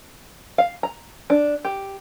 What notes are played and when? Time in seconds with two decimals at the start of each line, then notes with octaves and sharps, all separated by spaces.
0.58 F5
0.83 A#5
1.30 D4
1.65 G4